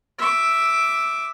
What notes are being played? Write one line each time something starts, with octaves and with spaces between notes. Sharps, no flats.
E5 D6